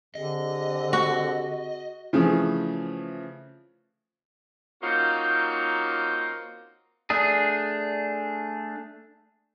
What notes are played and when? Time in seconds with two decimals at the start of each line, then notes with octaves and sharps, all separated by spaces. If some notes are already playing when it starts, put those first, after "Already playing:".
0.15 D3 C4 G4 G#4 D#5
0.93 F#4
2.13 C#3 E3 F3 A3 G#4
4.83 A#3 C4 C#4 D#4 F4 F#4
7.10 A3 D4 G#4